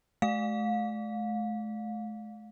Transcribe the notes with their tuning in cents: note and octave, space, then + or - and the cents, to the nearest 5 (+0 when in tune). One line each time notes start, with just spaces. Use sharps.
A3 -40 F5 +30